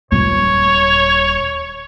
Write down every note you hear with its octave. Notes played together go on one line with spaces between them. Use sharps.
D#1 C#5